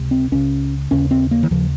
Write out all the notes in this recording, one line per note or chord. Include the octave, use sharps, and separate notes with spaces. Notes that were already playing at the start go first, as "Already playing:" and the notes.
Already playing: C#2 C3
C4
C#2 C#3 C#4
D#2 C#3 C#4
C4
A#3
D#3
D#2 C#3 F3